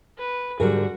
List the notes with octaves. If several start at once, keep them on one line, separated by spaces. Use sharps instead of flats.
B4
G#2 D3 G3 F#4 G#4 A#4